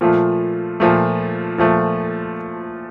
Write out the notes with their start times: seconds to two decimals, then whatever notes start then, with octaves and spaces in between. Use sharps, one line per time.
0.01 A#2 F3 A3
0.80 A#2 F3 A3
1.58 A#2 F3 A3